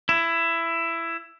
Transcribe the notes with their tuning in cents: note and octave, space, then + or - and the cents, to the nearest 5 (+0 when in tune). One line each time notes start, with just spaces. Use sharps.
E4 +15